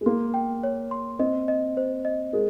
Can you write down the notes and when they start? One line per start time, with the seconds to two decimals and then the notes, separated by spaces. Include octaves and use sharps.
0.01 G#3
0.06 A#3 C6
0.34 G5
0.63 C#5
0.91 C6
1.19 C4 D#5
1.48 D#5
1.77 C5
2.05 D#5
2.33 G#3 A#4